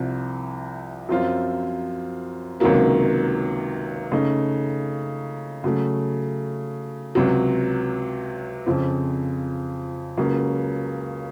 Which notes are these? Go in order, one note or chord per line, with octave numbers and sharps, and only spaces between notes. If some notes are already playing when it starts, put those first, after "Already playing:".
Already playing: C2 C3 F3
F#2 F3 C4 F4
C#2 C3 D#3 F#3 A#3
C#3 A3 D#4
C#3 F#3 A3
C#2 C3 F#3
F2 C#3 F3 C4
C#2 C#3 F#3 A#3